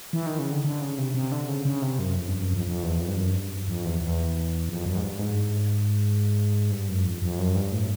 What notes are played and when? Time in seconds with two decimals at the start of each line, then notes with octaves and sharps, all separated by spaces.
0.13 E3
0.26 D#3
0.39 C#3
0.52 D3
0.64 D3
0.81 C#3
0.98 C3
1.14 C3
1.32 D3
1.48 C#3
1.65 C#3
1.82 C3
1.99 F#2
2.16 F2
2.28 G2
2.41 F#2
2.54 F2
2.67 F2
2.83 E2
3.00 F2
3.08 G2
3.17 F#2
3.34 G2
3.68 F2
3.85 E2
4.01 E2
4.69 F2
4.86 F#2
4.97 G#2
5.03 G2
5.19 G#2
6.71 G2
6.88 F#2
7.05 F2
7.22 F2
7.39 F#2
7.55 G2
7.72 A2